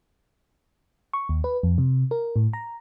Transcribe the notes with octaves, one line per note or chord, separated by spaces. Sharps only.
C#6
D#2
B4
F2
C3
A#4
A2
A#5